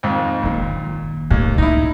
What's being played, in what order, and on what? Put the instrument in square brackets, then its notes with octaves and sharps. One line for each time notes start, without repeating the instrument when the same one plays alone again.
[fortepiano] F2 G#2 D#3
[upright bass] F#1 D#3 [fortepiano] A#2
[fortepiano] D#2 [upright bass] A2 C#3
[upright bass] C#2 [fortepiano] D#4 E4